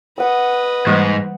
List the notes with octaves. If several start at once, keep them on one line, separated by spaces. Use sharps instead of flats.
B4 D#5 F#5 E6
G#2 E3 G3 A#3